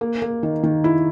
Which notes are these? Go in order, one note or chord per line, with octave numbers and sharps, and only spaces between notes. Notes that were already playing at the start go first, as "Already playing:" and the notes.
A#3
A#3
D#3
D#3
E4